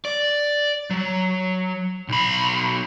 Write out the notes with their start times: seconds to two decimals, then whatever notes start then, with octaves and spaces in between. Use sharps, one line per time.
0.05 D5
0.90 F#3
2.09 B1 B5